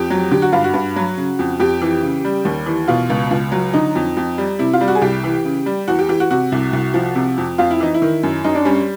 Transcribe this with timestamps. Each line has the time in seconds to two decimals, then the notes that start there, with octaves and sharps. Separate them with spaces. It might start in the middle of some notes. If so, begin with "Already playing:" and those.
Already playing: F2 G4
0.10 F#3
0.31 D3 G4
0.42 F#4
0.52 G2 F4
0.64 F#4
0.74 G2
0.96 F#3
1.17 C#3
1.39 F2
1.60 F2 G4
1.82 E3
2.03 C#3
2.25 G3
2.45 D#2
2.66 E3
2.88 B2 F4
3.10 C#2
3.31 C#2
3.52 F#3
3.74 D3 D#4
3.95 F2
4.17 F2
4.38 G3
4.59 C3 E4
4.73 F4
4.81 G3
4.88 F#4
4.95 G#4
5.02 C2 G4
5.24 E3
5.45 C#3
5.66 G3
5.88 E2 F#4
5.99 G4
6.09 E3 G4
6.20 F#4
6.30 C3 F#4
6.52 C2
6.73 C2
6.94 F3
7.15 C3
7.38 F2
7.58 F2 F4
7.71 E4
7.80 E3 D#4
7.94 E4
8.02 D#3
8.23 F#2
8.44 F#2 D#4
8.55 D4
8.65 G3 C#4